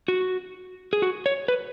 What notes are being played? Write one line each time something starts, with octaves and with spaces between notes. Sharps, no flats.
F#4
G#4
F#4
C#5
B4